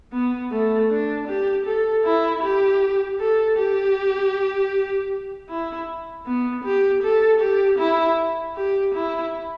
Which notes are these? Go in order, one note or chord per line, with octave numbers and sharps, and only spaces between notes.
B3
A3
D4
G4
A4
E4
G4
A4
G4
E4
B3
G4
A4
G4
E4
G4
E4